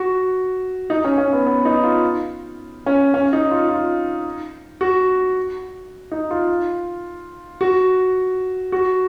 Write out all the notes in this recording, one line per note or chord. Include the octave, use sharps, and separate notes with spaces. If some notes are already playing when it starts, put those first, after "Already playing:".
Already playing: F#4
D#4
C#4
C#4
B3
B3
D#4
F4
C#4
C#4
D#4
F4
F4
F#4
D#4
F4
F#4
F#4